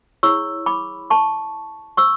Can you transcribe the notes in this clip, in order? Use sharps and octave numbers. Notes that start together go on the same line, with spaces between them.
E4 G#4 C#5 C#6 E6
B5 D6
A5 C#6
C#6 E6